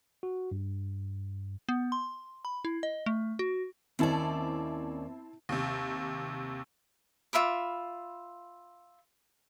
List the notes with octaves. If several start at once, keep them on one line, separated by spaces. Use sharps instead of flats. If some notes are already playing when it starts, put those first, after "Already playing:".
F#4
G2
B3
C6
B5
E4
D#5
A3
F#4
D#2 C4 C#4 E4 D5 A5
D#2 C3
F4 E5 B5 D6